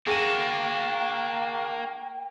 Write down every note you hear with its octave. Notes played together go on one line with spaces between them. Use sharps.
A#3 D4 F#4 G#4 G5 D#7